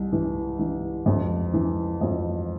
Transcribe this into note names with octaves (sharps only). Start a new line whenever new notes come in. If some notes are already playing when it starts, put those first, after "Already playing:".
Already playing: C2
E3
E3
F2
E3
F2